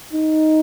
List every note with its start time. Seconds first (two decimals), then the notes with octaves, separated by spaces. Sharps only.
0.13 D#4